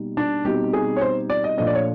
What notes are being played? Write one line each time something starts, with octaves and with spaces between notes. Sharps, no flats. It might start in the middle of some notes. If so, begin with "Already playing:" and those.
Already playing: B2 G3 A#3 D#4
D4
B2 G3 C4 D#4 G4
G#4
C#5
C5
D5
D#5
A#2 F3 A3 D4 D#5
D5
C#5